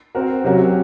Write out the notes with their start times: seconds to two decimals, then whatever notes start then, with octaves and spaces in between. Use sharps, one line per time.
0.15 C4 F#4 A#4
0.44 C3 F#3 C#4 F#4 A#4